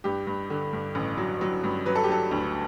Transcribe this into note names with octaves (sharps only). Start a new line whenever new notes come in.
G2 G4
G2
D3
G2
A1
F#3
F#3
G2
F#3 B4
A4
G4
F#3 A4
D2